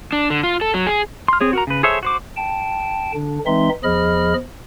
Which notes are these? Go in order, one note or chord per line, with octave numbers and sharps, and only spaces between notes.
D4
D3
F4
A4
F#3
G#4
C6 F6
C4 G#4 C#5
F#4 A#4 A#5
C#3 B4
G#4 A4 C5 C#5 E5
F#4 C5 D6
G5 A5
D3 D4
E3 G#3 C4 D#4 E5 C6
E2 F3 G#4 D#5 B5 F6